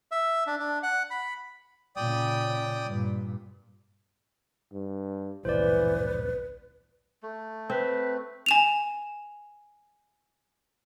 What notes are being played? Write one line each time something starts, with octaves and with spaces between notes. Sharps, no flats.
E5
D4
D4
F#5
B5
A#2 C#3 D5 G5 D#6
G2 A#2
G2
D1 A#1 E3 B4 C5 D5
A3
C4 B4
G#5 E7 F7